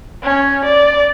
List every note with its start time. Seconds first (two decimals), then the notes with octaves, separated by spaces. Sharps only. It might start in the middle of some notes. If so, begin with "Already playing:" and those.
0.23 C#4
0.65 D5